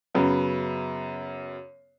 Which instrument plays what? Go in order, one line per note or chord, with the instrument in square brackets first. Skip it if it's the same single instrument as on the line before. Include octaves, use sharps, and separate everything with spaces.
[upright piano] F#2 C#3 B3